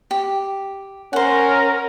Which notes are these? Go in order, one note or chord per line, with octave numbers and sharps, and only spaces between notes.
G4
C#4 A#4 C5 F#5